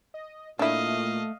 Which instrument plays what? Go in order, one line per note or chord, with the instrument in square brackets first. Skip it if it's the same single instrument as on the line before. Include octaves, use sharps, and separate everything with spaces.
[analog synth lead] D#5
[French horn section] A#2 [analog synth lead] A3 [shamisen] D4 E4 [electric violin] D#5 F5